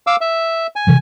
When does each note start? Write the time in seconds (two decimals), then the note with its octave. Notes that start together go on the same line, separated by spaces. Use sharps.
0.07 F5 D6 E6
0.21 E5
0.76 G#5
0.87 C3 E3 F3